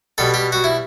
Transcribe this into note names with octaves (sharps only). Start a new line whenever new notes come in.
B2 G3 A4
G4
F#4
E4